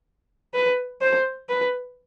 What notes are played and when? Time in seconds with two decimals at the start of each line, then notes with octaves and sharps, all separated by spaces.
0.54 B4
1.01 C5
1.49 B4